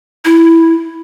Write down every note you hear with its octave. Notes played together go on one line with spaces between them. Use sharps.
E4